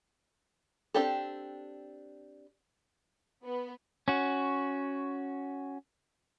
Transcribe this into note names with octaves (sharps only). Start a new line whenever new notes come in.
C4 D4 G4 A4
B3
C#4 F#4